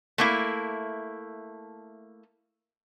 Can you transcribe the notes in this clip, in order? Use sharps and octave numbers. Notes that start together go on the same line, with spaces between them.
A3 A#3 E4